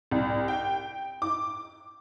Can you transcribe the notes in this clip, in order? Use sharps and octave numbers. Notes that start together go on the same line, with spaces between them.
C2
G5
D6